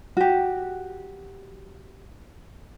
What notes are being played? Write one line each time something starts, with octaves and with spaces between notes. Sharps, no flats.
F#4 G4